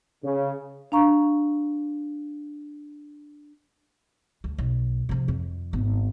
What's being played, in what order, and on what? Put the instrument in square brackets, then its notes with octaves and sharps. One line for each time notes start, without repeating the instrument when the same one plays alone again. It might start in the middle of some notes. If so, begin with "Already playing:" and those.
[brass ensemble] C#3
[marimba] D4 F5 A#5 C#6
[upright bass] D2
B1
C3 F3
F2
G#1 B3